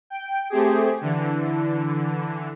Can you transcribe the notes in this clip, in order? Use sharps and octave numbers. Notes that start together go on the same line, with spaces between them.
G5
A3 C4 G4 G#4
D3 E3